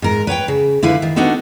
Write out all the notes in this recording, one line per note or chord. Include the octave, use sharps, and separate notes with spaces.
G#2 A#4
B4 C#5 F#5 G5
C#3
D3 E4 B4 F5
D#3
B3 D4 D#4 F#4 A4